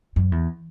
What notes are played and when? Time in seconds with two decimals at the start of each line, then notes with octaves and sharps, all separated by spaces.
0.16 F#2
0.32 E2